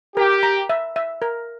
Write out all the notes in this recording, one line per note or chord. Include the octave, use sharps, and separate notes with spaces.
G4 A#4
A#5
E5
E5
A#4